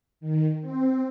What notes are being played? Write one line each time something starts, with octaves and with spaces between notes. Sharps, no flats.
D#3
C4